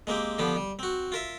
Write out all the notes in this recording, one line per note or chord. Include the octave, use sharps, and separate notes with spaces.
G#3 A#3 C4 G4
D3 F3 B3 G4
G3
C4 F#4
F4 A#4 E5